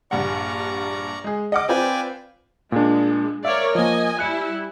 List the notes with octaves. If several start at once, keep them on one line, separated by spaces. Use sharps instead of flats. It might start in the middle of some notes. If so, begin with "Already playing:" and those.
A#1 G2 D5 F#5 A#5 C#6
G#3 G#4
D#5 F#5 D6
C4 F4 B4 D5 G5 G#5
A#2 G#3 D4
A#4 C#5 D5 E5 F5
F3 A#3 D#5 G#5
G3 E4 G#5 F#6 C#7